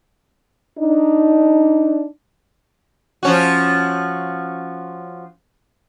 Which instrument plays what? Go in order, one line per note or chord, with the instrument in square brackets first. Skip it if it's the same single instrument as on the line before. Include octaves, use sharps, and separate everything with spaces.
[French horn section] D4 D#4
[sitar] F3 C#4 F#4